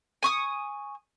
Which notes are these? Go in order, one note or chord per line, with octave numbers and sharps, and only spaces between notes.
G#5 C#6 D#6